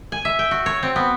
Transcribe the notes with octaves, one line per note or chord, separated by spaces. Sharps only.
G#5
E5
G5
F#4
C#5
C4
B3